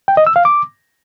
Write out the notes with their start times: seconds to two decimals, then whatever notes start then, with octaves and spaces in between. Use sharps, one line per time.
0.08 G5
0.17 D#5
0.27 E6
0.36 F5
0.45 D6